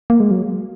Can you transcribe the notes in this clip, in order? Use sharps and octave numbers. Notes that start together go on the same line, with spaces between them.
A#3
G#3
F#3